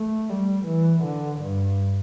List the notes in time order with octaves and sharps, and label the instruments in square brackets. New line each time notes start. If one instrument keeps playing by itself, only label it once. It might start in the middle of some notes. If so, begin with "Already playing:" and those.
Already playing: [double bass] A3
G3
E3
D3
G2